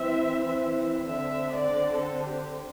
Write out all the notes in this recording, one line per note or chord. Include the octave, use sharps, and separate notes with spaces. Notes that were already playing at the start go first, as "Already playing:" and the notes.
Already playing: E3 C4 E5
D3 C4 E5
D5
A4
G4